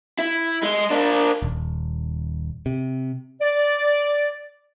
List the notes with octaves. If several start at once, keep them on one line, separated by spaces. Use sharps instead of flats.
E4
G#3
A#3 D4
D#1
C3
D5